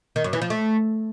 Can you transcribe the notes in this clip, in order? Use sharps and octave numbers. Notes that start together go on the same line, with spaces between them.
D#3
F#2
E3
F3
A3